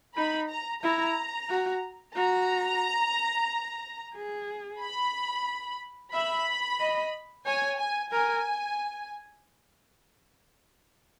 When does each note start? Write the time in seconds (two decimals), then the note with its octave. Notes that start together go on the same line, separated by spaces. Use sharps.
0.16 D#4 B5
0.49 A#5
0.82 E4 A#5
1.50 F#4
2.15 F#4 A#5
4.15 G#4
4.81 B5
6.13 E5 B5
6.80 D#5
7.46 C#5 G#5
7.79 G#5
8.12 A#4 G#5